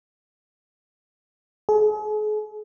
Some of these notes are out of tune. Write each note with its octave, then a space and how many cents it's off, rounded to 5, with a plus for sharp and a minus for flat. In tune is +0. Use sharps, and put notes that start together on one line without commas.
G#4 +40